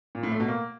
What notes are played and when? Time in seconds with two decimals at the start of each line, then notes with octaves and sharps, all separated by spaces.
0.15 A#2
0.23 A2
0.31 A3
0.40 B2
0.48 A#3